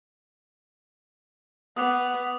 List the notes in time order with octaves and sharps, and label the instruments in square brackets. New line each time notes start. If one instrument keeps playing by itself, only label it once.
[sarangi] B3 [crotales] D6 D#6